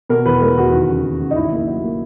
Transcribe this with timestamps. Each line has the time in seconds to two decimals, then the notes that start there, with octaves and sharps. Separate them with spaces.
0.09 B2 A#4
0.26 E2 B4
0.41 G#3 A#4
0.57 E2 F#4
0.73 D#2
0.89 C#3
1.04 D#2
1.20 C#3
1.31 D#4
1.36 G#1 E4
1.52 A#3
1.67 F#3
1.84 A#3